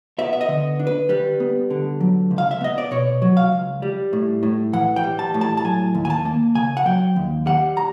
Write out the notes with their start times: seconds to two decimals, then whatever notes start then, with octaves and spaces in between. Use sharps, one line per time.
0.18 B3 E5
0.33 E5
0.41 D#5
0.48 D3
0.79 D4
0.87 B4
1.09 G3 B4
1.40 B3
1.70 D3
2.01 F#3
2.31 C#2
2.38 F5
2.51 E5
2.61 B3 D#5
2.78 D5
2.91 B2 C#5
3.22 F#3
3.37 F5
3.52 C#2
3.82 G3
4.13 A2
4.43 A2
4.73 E3 F#5
4.96 G5
5.03 G3
5.19 A5
5.34 A2
5.41 A5
5.57 A5
5.64 F#3 G#5
5.95 D#2
6.05 G#5
6.10 A5
6.25 A#3
6.55 C#3 G#5
6.77 F#5
6.86 F#3 G5
7.16 D#2
7.46 G3 F#5
7.77 A#5